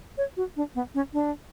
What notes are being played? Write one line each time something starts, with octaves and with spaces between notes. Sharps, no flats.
C#5
F#4
D4
B3
C#4
D4